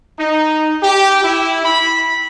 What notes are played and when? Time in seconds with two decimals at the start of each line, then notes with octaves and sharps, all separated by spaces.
0.19 D#4
0.83 G4
1.23 E4
1.65 B5